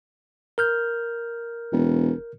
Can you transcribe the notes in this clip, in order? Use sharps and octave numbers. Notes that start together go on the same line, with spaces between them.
A#4 F6 G6
E1